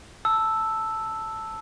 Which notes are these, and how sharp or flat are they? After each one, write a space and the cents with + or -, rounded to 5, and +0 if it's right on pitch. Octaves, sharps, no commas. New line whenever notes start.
A5 +5 E6 +0